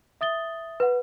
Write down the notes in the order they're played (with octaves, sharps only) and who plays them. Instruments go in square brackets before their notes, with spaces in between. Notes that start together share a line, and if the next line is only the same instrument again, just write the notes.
[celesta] E5 D#6 A6 G7
B4 F#5